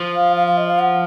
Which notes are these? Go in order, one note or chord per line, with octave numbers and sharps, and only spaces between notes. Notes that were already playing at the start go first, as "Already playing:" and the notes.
Already playing: F3
F5
F5
F5
D#5
F5
F#5